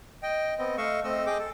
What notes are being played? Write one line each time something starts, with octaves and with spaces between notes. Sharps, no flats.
D#5 G5
B3 C4 D#5
A3 D#5 F5 C#6 E6
A3 C4 D#5 E6
G#4 D#5 G5 D6
A4